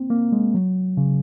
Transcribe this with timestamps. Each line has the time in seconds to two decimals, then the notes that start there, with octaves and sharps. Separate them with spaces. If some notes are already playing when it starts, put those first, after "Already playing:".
Already playing: A#3 C4
0.10 A#3
0.32 G#3
0.54 F#3
0.97 C#3